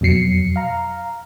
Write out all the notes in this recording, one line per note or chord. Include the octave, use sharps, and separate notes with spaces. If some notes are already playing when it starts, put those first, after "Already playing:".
F2 B2 F#3 C7 C#7
F5 A#5